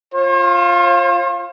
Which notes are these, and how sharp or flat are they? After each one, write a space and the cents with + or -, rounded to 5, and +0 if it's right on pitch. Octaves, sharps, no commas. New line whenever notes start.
F4 +0 C5 +45